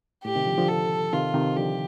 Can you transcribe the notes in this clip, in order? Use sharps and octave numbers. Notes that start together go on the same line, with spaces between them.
A2 G4
C3 D#3
D3 F3
D3 F3
A4
C3 D#3 F4
C3 D#3
D3 F3 G4